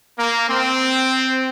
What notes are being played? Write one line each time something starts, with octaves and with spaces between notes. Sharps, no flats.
A#3
C4